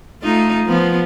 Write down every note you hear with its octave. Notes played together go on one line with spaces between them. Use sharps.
A3 D#4 F4
F3 B3